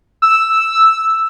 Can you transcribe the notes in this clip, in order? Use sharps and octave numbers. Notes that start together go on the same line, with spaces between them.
E6